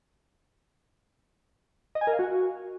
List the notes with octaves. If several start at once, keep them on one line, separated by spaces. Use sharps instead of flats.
D#5
G#5
A#4
F5
F#4